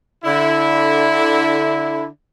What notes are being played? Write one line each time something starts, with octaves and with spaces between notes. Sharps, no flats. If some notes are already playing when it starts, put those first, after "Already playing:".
D3 E4